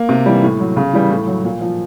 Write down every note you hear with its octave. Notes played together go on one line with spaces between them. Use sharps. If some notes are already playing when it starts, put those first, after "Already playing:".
Already playing: A#3
C3
E3 G3
A2
F#3
C#3
E3 G3
A2
F#3
A#2
F3